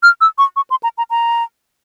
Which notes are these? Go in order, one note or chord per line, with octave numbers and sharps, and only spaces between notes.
F6
E6
C#6
C#6
C6
A#5
A#5
A#5